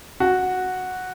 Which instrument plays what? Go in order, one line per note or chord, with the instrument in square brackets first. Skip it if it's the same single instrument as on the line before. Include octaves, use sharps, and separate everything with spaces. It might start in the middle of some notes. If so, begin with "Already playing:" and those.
[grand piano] F#4